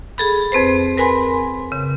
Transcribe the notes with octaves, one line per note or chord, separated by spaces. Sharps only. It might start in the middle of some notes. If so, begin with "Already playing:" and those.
G#4 A4 B5
F2 C4 B4 C5
A#4 B4 G#5 B5 C6
C#3